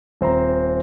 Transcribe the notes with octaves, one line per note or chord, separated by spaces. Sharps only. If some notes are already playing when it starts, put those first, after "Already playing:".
D#1 C4 C5 A#5